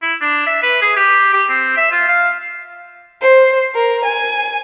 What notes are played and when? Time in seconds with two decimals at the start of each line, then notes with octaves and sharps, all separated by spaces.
0.02 E4
0.21 D4
0.47 E5
0.63 B4
0.82 G#4
0.96 G4
1.33 G4
1.49 C4
1.77 E5
1.92 F4
2.08 F5
3.21 C5
3.75 A#4
4.05 G#5